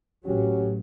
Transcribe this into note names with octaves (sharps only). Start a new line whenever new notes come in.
A1 F#3 C#4 F#4 G4